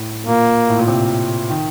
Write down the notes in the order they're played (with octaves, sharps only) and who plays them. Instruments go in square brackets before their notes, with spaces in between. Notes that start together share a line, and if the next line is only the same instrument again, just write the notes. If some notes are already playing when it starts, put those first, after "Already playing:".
Already playing: [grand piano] A2
[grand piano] A#2 [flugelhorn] A#3
[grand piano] A2
A#2
C3
D#3